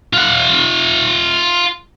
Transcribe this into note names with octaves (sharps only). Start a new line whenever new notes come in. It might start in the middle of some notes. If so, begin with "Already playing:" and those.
F4 F#5